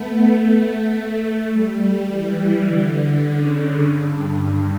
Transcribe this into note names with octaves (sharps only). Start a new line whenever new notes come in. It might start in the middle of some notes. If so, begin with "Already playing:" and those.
Already playing: A3 B3
A3
G3
E3
D3
C#3
G2